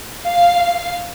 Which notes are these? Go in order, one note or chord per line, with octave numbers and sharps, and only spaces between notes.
F5